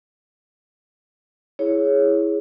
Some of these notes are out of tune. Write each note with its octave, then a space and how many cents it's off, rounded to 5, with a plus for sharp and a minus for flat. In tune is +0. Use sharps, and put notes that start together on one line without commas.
E4 +0 G#4 +0 C#5 +0